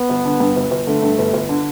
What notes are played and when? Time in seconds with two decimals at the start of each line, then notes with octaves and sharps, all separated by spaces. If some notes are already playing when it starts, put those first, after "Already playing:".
Already playing: B3
0.09 G1
0.25 D3
0.40 G2
0.56 G1
0.71 G1
0.87 D3 A3
1.03 G2
1.18 G1
1.33 G1
1.49 D3